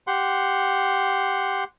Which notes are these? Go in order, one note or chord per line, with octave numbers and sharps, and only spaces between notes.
G4 F#5 C6